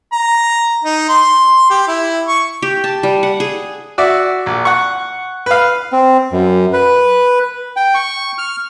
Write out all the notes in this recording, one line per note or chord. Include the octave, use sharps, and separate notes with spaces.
A#5
D#4
C6
G4
E4
C#6
G4
A5
G3
F#5
G#4
F#4 D5 E5
A#1
F#5 C#6
B4 F5
C4
F#2
B4
G5
C#6
F6